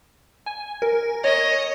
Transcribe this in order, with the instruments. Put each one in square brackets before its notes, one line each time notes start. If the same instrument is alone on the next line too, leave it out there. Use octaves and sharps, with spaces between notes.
[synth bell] G#5
A#4
[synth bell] C#5 [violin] D#5